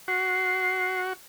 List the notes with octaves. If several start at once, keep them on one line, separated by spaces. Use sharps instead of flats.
F#4 C7